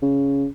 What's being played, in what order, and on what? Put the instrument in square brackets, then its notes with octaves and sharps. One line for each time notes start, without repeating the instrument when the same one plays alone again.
[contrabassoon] C#3